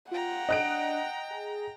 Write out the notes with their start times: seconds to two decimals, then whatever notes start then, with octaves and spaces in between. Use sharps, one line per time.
0.11 F4 F#5 G5 A#5
0.49 D4 D#5 F#6 D7
1.30 G#4